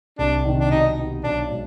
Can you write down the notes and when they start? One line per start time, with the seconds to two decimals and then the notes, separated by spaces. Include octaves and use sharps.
0.19 C2 D4
0.45 C3 D#3
0.60 D4
0.70 B2 D#4
0.98 B3 D#4 G4
1.24 B1 D4
1.49 B2 G#3